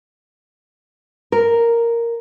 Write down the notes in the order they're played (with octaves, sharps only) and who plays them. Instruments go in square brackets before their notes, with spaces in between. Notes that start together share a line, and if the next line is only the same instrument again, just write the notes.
[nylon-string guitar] A#4